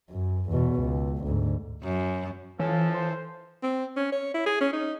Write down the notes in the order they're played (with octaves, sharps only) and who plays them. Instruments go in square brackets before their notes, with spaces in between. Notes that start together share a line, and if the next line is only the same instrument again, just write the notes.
[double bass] F#2
E2 B2
C#2
D2 G#2
[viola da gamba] F#2
[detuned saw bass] E3 [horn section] F3 A4 [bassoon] C#4
[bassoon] C5
[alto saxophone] C4
C#4
C#5
E4
G#4
C#4
D#4